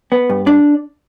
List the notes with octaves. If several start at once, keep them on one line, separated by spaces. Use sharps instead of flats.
B3
G2
D4